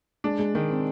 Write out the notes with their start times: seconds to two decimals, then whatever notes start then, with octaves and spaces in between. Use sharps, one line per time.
0.24 G#3 D4
0.39 G#3
0.54 D#3 G#3
0.70 C4